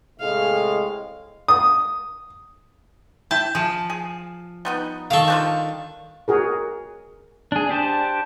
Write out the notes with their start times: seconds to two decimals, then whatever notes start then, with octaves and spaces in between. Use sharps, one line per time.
0.20 A2 C3 G#3 F5
1.48 D#6
3.31 E4 G5 A5
3.55 F3 G#4
3.90 G#4
4.65 G3 B3 D#4
5.11 D#3 A4 F5 C#6
5.28 G3 D4 F4
6.28 F#4 G#4 A#4
7.52 D4 G#4
7.69 D4 G4 C5 A5